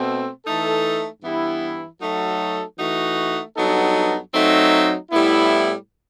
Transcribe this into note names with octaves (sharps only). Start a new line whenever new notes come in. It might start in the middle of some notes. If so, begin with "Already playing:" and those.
Already playing: B2 A3 C4
E3 A3 D#4 A4
G2 E3 B3 E4 G4
F#3 A3 D#4 F#4 A4
E3 A3 D#4 F#4
G2 F#3 B3 D#4 A4
F#3 A3 C4 D#4
A2 G3 B3 E4